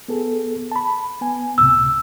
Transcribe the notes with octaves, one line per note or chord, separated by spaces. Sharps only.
B3 G#4 A4
A5 B5
B3 G#5
C#2 A2 C3 E6